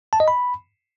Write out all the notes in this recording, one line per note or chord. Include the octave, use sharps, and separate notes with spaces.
A5
D#5
B5